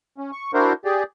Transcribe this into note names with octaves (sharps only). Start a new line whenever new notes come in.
C#4
C#6
D4 E4 F#4 A#4 C5
G4 G#4 D5